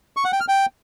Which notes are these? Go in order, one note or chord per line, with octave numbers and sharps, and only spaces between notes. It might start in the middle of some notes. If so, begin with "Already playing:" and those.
C#6
F#5
G5
F6
G5